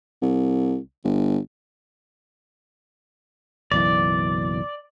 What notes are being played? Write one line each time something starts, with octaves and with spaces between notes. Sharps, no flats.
C2
G1
F#1 B1 E3 D5